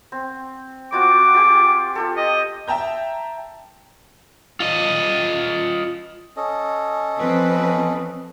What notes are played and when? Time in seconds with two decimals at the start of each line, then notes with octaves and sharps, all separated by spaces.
0.12 C4
0.92 C4 F4 F#4 D6
1.34 F4 G4 G#4
1.95 F4 G4 A4
2.17 D#5
2.68 E5 G5 A5 A#5 G6
4.60 F4 D#5
6.37 C#4 A4 D#5
7.16 F3 C4 B4